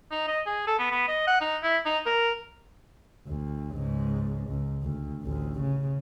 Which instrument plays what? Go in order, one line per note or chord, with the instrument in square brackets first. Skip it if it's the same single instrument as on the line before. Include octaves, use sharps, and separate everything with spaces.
[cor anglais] D#4
D#5
G#4
A4
B3
B3
D#5
F#5
D#4
E4
D#4
A#4
[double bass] D2
C#2 G#2
C#2
D2
A1 D2
C#3